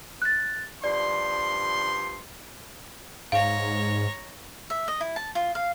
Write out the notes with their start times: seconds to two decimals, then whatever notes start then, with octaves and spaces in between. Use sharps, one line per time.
0.22 F#6 A6
0.84 G2 F3 D5 C6
3.32 G#2 C#5 F5 A#5
4.70 E5
4.88 D#5
5.01 E4
5.16 A5
5.35 F4
5.55 F5